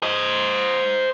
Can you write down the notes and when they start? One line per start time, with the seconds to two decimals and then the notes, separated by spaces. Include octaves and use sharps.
0.03 C5 D#5